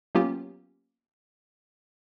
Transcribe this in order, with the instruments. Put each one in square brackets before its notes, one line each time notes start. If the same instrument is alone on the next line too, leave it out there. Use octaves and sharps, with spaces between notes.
[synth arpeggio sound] F#3 A#3 B3 C#4 F4 G4